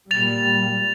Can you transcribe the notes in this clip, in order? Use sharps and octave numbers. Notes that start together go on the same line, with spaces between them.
A#2 G3 A6 F7